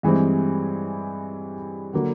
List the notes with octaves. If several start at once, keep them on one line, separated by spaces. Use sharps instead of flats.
G2 E3 G#3 C4
D3 F#3 A#3